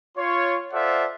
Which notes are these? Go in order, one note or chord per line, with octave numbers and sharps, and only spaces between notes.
F4 C#5 C6
F4 A4 C5 D5 E5 F#5